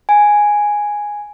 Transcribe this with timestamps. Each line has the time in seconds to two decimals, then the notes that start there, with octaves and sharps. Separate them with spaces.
0.09 G#5